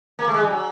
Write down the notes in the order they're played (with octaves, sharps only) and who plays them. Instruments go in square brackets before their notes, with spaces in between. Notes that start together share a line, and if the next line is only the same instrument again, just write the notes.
[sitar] A#3
A3
G#3
G3
F#3